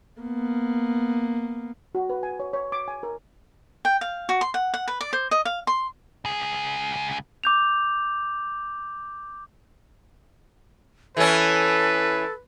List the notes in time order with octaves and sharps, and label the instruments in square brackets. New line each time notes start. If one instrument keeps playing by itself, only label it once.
[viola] A#3 B3
[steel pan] F#4
B4
G#5
C#5
C#5
D6
G#5
A#4
[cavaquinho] G5
F5
F#4
C6
F#5
F#5
B4
D5
C5
D#5
F5
C6
[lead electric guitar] C#2 G#4
[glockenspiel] D6 G6 F7
[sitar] E3 C#4 [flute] A4 [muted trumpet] B4